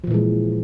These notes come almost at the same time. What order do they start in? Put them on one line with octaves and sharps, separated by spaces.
F3 A#2 E3 G#3